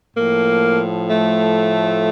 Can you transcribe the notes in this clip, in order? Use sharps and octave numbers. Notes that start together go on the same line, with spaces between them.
A2 F3 A#3
A3